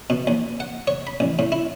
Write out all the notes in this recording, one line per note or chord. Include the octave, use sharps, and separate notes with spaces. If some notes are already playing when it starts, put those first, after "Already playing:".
B2
D#2
F#5
C#5
B5
A1
A2
E4